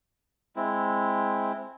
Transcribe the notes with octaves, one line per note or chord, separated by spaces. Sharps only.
G#3 C4 E4